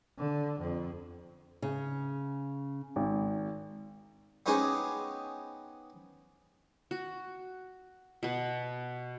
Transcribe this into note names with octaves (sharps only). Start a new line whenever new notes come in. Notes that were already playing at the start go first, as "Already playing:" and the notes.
D3
F2
C#3
G#1
B3 C#4 D#4 G4 G#4 C5
F#4
B2 B3